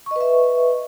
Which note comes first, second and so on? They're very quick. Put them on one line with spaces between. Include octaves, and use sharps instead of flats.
C#6 D#5 B4 E5